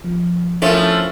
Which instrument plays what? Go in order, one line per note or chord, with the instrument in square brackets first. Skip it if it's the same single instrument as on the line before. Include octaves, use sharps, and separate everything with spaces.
[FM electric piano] F3
[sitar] F3 A3 [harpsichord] C#4 E4 A4 [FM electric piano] D4 A#4